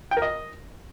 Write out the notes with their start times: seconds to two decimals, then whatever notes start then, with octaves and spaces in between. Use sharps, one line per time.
0.11 G5
0.17 A#4
0.22 D#5